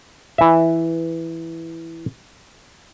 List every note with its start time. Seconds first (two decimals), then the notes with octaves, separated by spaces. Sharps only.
0.38 E3 E5